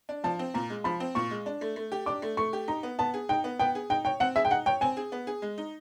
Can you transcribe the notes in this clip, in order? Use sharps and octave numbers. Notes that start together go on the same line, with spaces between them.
D4
F3 A5
C4
A#2 A#5
G#3
F3 B5
C4
A#2 C#6
G#3
D4
A3
A3
G4
D4 D6
A3
A3 C#6
G4
D#4 A#5
B3
B3 A5
G#4
D#4 G5
B3
B3 G5
G#4
D#4 G5
C#5 G5
C4 F#5
G#4 E5
G5
D#4 F#5
C#5 G5
C4 G#5
G#4
B3
G#4
G#3
D#4